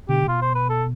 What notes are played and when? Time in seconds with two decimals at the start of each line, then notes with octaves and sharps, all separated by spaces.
0.09 B2 D3 G4
0.27 B2 F4
0.42 C5
0.55 B4
0.69 A4